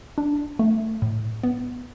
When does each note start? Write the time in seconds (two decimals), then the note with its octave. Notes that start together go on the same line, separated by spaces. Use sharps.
0.18 D4
0.59 A3
1.02 A2
1.43 B3